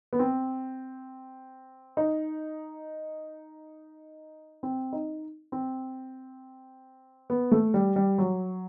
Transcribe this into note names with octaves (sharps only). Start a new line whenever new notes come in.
B3
C4
D#4
C4
D#4
C4
B3
A3
G3
G3
F#3